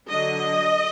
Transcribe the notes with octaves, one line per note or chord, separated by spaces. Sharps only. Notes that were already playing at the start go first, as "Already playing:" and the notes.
D3 F#3 D4 D#5